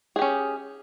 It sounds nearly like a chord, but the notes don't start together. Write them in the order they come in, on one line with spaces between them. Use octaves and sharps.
G#4 G4 C#4